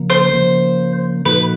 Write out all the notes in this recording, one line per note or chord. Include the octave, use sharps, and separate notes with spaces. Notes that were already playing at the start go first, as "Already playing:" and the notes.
Already playing: C#3 F3 A#3
C5
C#3 F3 A#3
A#2 F3 A#3 D#4 F#4 B4